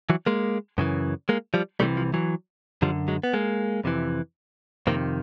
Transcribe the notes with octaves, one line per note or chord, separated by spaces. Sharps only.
E3 F#3
G#3 A#3
F#2 C#3 E3
G#3 A#3
F3 G3
C2 C3 E3 G3 A3
F3
E3 F#3
F#2 D3 F3 G3
F#3 G#3
B3
G#3 A#3
F2 C3 E3
F2 C3 D#3 A#3 C4